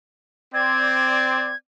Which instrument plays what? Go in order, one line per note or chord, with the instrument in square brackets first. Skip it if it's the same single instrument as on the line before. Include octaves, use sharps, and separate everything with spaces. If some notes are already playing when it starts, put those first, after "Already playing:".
[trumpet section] C4 D5 [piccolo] G#6